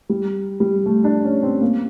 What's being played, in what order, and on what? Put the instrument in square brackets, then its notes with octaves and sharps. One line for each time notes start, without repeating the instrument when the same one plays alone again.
[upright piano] G3
G3
A3
D4
C#4
C4
A#3